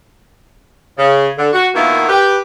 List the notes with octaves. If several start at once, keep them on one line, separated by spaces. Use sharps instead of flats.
C#3
D3
F#4
B2 D#3 A#3 B3 E4 F4
G4 B4